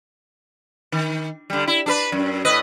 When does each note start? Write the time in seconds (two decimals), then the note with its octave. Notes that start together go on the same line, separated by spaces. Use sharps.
0.92 D#3
1.50 D3 G3
1.67 E4
1.86 D4 A4 B4
2.12 F#2
2.45 A2 B4 D#5